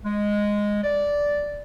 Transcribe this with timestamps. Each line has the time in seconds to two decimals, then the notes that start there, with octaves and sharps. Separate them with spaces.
0.04 G#3
0.84 D5